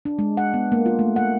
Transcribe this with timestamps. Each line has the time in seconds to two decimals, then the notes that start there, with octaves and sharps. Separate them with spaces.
0.05 D4
0.19 G#3
0.37 F#5
0.54 B3
0.72 A#3
0.86 F4
0.99 A3
1.16 F#5